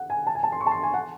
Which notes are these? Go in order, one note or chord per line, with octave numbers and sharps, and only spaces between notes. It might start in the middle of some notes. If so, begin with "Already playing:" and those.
Already playing: F#5
G#5
A5
G#5
A5
C6
C#6
A5
C6
G#5
F#5